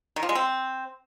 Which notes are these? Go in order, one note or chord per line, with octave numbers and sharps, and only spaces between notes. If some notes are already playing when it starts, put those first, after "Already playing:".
D#3
F3
G#3
C4